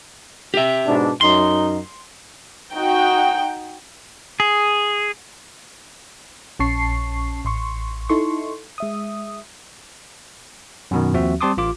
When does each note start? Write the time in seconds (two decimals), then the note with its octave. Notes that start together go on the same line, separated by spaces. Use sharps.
0.54 G4 E5
0.86 G#2 B2 D4
1.21 F#2 D#4 C6
2.74 D#4 F#4 G5
4.40 G#4
6.59 A#1 C#4 A5 C#6 C7
7.45 A1 C6 C#6
8.09 D#4 E4 A4 C6 C#6
8.78 G#3 E5 D#6
10.91 F#2 B2 D#3
11.14 D#2 F3 C4 F#4 E5
11.41 G3 C4 A5 C6 D6 D#6
11.57 A1 F4 D6